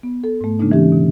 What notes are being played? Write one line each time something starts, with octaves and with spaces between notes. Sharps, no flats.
B3
A4
G#2 A3
C#3 G#3 A#3 D4 D#4
E3 C#4 G4
B2 D3